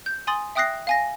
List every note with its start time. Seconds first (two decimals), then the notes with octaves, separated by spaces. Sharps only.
0.06 G6
0.27 G#5 C6 D#6 A6 F#7
0.55 E5 G5 D#6 F#6 A#6 C7
0.87 F5 G#5 A#6